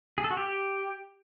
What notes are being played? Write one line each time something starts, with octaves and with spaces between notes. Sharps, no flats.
G#4
A4
F#4
G4